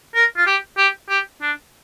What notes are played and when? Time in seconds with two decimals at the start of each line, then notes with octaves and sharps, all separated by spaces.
0.15 A#4
0.37 F4
0.47 G4
0.77 G4
1.09 G4
1.42 D4